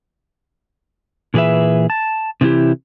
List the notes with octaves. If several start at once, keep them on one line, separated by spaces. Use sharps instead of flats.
A#2 E3 G#4 B4 E5
A5
C3 E3 A3 E4 G4